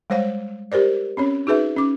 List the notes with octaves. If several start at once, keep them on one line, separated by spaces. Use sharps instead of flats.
G3 G#3 C5 C#5 F5
G4 A#4 C5 D5
C4 C#4 C#5
D#4 F#4 G#4 B4 E5
C#4 D6